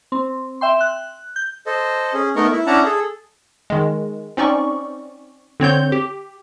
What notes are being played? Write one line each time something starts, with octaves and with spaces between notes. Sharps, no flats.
C4
E5 G5 C6
F#6
G6
A4 C5 D#5
C#4 G#4
A3 B3 D#4 A#4 D#5 C#6
E4
C#4 D4 E4 F#5 A5 A#5
G#4 A4
D#3 G#3
C4 C#4 D#4 D5 C#6
D3 C4 C#5 G6
G4